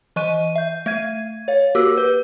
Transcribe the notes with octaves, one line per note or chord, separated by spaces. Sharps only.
E3 D#5 C#6 F#6 D#7
E5 G6
A3 E5 G#6 D#7
C#5 F5
A#3 F#4 G4 A#4 D6 E6
B4